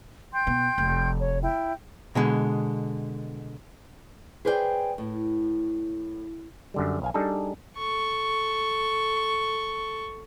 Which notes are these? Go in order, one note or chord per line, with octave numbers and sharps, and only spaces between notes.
G5 C6 G6
B2
F1 F2
C#5
E4 G5
B2 D3 G#3
G#4 B4 C5 D5 E5 G5
A2
F#2 D3 G3
B1 F5 G#5
G3 D4 D#4 G#4 A4
A4 C#6